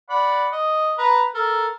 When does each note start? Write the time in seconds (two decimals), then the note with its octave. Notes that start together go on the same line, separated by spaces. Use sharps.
0.10 D5 F#5 B5
0.52 D#5
0.98 B4 A#5
1.35 A4 A#4